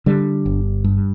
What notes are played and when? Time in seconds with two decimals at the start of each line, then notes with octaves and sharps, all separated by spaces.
0.06 D3 G3
0.46 G1
0.84 G2